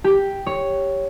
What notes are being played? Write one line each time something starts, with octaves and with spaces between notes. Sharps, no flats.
G4
C#5